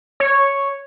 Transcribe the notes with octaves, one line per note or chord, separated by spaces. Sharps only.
C#5